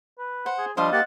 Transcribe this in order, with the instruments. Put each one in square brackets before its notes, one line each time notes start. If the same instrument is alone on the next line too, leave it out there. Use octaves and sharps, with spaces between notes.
[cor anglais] B4
[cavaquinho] C5 [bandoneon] F#5
[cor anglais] G#4
[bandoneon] F3 D4 [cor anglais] G3 [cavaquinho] C5 D#5 F5 [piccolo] C6
[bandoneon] A#3 G4 [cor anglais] F#5 [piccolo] A6